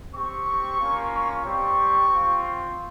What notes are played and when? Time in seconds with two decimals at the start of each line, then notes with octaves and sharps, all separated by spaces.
0.14 C4 G4 C#6
0.79 A#3 C#4 F4
1.11 C#6
1.43 G3 C4 G4 C#6
2.08 C4 F4
2.41 C6